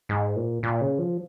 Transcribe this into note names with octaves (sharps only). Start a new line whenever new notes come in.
G#2
A#2
A#2
C#3
F3